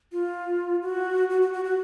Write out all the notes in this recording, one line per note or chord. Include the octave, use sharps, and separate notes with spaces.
F4
F#4
F#4
F#4
F#4
F#4